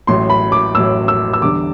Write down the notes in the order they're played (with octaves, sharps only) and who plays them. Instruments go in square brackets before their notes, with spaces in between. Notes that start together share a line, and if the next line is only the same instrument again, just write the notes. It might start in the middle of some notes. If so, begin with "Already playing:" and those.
[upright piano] A1 A2 F#3 C6
B5
D6
A1 A2 F#3 E6
E6
E6
E2 D3 G3 D6